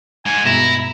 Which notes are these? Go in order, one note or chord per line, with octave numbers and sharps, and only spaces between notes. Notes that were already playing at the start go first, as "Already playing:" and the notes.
G#2 G#5
G2 B2 G#3 E4 A#5